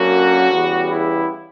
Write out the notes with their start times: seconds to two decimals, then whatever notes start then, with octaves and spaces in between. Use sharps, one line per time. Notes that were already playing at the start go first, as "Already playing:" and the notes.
Already playing: F#2 D3 A#3 C#4 F#4
0.51 E2 C#3 G3 B3
0.91 E4